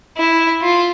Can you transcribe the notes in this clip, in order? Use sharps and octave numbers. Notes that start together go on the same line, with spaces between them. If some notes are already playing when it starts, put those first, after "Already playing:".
E4
F4